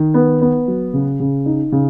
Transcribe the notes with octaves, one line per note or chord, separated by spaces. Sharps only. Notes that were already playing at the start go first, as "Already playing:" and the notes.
Already playing: D#3
B3
B3
F#3
C#3
C#3
D#4
C#3